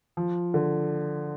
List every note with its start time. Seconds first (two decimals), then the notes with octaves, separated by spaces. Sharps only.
0.17 F3
0.54 D3